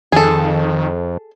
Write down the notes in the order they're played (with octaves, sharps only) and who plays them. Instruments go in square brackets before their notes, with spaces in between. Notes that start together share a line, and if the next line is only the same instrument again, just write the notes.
[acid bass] F2 [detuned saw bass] D#3 [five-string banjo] G#4 A4